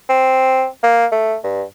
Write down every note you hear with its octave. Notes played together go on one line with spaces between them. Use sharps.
C4
A#3
A3
G2